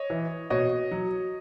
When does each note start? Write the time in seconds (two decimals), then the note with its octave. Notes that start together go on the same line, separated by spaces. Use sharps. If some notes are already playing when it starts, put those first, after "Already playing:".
Already playing: C#5 D#5
0.10 E3
0.50 B2 C#5 D#5
0.91 F#3